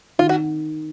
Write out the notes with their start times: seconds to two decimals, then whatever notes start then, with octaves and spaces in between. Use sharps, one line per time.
0.19 D#3 F4
0.29 F#4